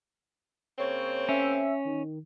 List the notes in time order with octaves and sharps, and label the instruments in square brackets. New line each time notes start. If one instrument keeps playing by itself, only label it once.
[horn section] C#3 A#3 C4 [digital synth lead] C#5
[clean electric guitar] C#4 [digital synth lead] E5
[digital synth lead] D#3